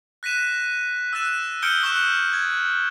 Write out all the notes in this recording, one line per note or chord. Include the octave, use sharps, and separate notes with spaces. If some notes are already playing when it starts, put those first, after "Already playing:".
F#6 A#6 B6 D#7 E7
E6 F#6 A6 E7
D#6 F6 G6 C#7 D7 G7
C#6 D#6 E6 F#6 E7
G#6